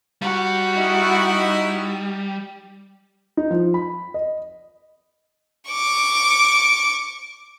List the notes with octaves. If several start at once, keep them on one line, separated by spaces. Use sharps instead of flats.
G3 F#4
D#4 E4
D#4
F3
B5
D#5
C#6 D6